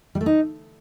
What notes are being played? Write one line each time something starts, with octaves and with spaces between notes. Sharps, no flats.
G3
A3
D#4